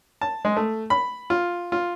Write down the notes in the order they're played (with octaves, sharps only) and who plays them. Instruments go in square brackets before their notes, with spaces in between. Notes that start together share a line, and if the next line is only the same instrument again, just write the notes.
[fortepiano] A5
G#3
A3
B5
F4
F4